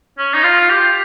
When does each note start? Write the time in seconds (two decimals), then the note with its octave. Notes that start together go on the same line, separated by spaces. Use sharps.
0.18 C#4
0.34 D#4
0.43 F4
0.70 G4